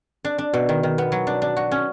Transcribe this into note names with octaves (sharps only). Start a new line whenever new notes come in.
D4
D4
B2
D#3
D#3
B3
F#3
D4
D4
F#4
C#4